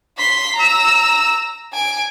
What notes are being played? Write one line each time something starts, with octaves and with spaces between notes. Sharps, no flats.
C6 B6
A#5 E6
G#5 D7